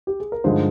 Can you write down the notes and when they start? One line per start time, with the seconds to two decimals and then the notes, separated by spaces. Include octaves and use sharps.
0.07 G4
0.20 G#4
0.32 A#4
0.44 G2 D3 F3 G#3 D#4 C5